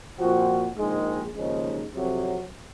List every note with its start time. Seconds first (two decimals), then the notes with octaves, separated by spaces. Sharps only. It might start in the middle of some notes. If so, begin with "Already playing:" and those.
0.19 A#2 F3 C4 F#4
0.77 A#1 G#2 D#3 G#3
1.36 D#2 C#3 F3 G#3 D#4
1.94 F2 C3 F#3